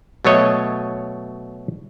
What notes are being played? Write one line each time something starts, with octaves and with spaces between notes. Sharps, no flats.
B2 F#3 A3 C#5 D#5